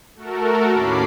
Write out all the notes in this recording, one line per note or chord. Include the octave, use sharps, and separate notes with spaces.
A3 F#4 A4 A#4
D#2 A2 C#4 B5 D6 C7